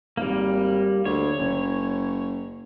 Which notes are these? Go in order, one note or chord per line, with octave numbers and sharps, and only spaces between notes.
G#1 G3 A#3
D2 C#5
F#1